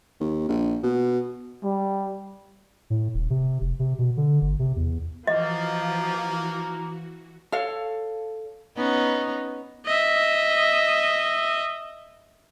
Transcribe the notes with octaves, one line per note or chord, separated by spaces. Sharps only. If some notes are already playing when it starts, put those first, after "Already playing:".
D#2
A#1
B2
G3
A2
D#1
C3
F1
C3
B2
D3
G1
C3
E2
E3 F3 A#3 F#4 D#5
A4 C#5 F5
B3 C#4 D#4
D#5 E5